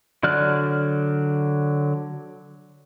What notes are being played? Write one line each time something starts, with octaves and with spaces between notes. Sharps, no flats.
D3 F#3 D5 F6 F#6